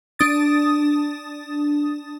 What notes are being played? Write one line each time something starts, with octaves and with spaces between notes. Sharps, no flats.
D4 D#6 A6